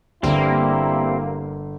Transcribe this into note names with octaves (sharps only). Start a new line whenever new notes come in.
G1 G3 A#3 C4 E4